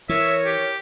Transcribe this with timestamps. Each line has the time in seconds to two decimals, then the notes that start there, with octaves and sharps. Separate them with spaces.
0.09 E3 A#4 C#5 E5
0.46 G4